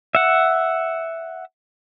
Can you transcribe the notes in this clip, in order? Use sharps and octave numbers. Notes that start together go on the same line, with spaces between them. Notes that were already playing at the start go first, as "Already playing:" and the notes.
E5 F#5